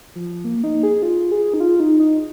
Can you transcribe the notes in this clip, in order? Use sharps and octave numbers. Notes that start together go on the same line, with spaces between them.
F3
A#3
D#4
G#4
F4
G#4
D#4
F4
D#4
D#4